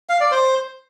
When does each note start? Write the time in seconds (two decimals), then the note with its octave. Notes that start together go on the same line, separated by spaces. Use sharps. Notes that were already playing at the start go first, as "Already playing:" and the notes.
0.09 F5
0.20 D5
0.31 C5